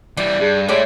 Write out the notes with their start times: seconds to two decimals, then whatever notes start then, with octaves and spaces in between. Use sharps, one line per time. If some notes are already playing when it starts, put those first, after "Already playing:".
0.17 E3 G3 D4
0.40 G2 G#4
0.69 G#3 A3 E4 G4 C#5 D5